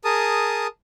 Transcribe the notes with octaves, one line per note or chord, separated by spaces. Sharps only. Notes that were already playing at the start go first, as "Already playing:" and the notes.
G#4 A#4 A5 D#6